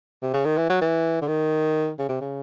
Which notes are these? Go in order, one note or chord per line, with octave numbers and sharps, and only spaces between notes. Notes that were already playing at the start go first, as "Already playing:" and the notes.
C3
C#3
D#3
E3
F#3
E3
D3
D#3
C#3
C3
C#3